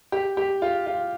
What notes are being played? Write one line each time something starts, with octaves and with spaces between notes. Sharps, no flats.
G4
G4
F4
F4